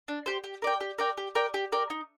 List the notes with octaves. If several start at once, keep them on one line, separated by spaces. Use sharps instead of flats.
D4
G4 C5
G4
A#4 D5 G5
G4
A#4 D5 G5
G4
A#4 D5 G5
G4
A#4 D5 G5
D#4